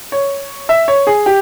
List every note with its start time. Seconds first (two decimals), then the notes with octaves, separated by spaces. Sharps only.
0.12 C#5
0.69 E5
0.88 C#5
1.07 G#4
1.26 G4